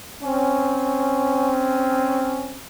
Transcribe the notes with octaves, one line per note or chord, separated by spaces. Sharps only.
C4 C#4